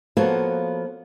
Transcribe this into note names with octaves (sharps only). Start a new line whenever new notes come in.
F3 A#3 B3 F#4 A4 C#5